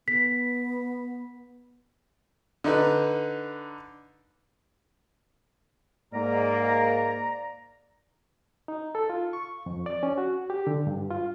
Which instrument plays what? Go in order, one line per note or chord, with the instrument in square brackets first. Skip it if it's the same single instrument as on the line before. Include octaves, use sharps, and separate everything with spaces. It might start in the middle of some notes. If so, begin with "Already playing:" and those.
[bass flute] B3 [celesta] B6
[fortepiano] D3 D#4 B4
[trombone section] G#2 A#3 [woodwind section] D5 A#5
[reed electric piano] D#4
A4
F4
C#6
F2
D5
C#4
F#4
G4
D3
G2
F4